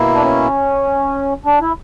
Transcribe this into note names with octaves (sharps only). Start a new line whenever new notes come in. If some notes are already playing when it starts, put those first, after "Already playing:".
Already playing: B2 A#3 E4
D4
C#4
D4
E4